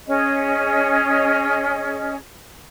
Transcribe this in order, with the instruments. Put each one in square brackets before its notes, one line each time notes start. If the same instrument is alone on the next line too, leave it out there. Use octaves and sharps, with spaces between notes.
[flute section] C#4 G#4 D#5